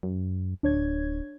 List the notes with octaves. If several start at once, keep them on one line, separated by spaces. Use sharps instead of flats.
F#2
D1 D4 C#5 G#6